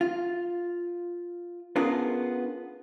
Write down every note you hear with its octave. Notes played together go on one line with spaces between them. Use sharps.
F4
B3 C#4 D4 F4 G#4 A#4